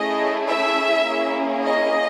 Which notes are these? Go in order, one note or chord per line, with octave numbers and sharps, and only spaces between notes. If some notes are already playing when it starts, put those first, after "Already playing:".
Already playing: A3 C#4 E4 G#4 D#5
E5
A#3 C#4 E4 G#4
D#5